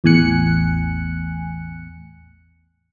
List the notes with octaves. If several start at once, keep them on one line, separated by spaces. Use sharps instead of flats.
A1 E2 A2 G#5 F#6 C#7